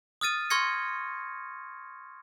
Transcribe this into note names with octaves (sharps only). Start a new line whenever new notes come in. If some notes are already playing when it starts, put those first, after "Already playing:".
D#6 F6 A6 D#7
C6 C#6 F6 G#6 A#6 C#7